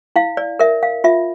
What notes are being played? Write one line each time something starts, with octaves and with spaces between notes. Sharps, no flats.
E4 F5
D5
A#4 E5
F5
F4 E5